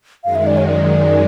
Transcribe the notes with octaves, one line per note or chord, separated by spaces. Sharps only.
F#2 D#3 G#3 F5
E5
D5
C#5
D5